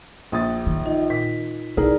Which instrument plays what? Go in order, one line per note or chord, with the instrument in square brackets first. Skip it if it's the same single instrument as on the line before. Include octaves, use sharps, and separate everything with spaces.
[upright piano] A#1 D#6 A6
[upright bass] D#3
[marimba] D#4 F4 D#5
[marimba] A#2 [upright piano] B6
[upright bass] B1 [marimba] D#4 E4 D5 [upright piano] G#4 A#4